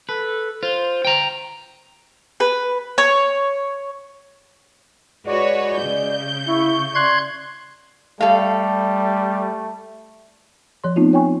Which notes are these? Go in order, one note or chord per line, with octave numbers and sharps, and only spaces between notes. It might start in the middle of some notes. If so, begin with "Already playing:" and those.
A4 B4
F4 C5
G5 A#5
B4
C#5
G#3 F#4 B4 C#5 D5
C#3 G6
E4 C#6
D5 C6 F#6 G#6
G3 A3 A4 F5
F3 C#5 C6
A3 B3 C4 D#4 F4
C#5 G5 G#5 C#6